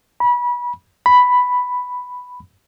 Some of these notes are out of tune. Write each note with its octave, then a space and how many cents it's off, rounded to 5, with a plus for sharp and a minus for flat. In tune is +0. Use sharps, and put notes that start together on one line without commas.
B5 -25
B5 +5